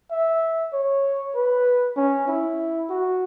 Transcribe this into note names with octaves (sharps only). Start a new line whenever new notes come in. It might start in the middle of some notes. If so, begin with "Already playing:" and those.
E5
C#5
B4
C#4
E4
F#4